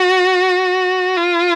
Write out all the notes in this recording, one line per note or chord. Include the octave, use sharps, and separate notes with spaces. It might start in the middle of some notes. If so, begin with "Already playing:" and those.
Already playing: F#4
F4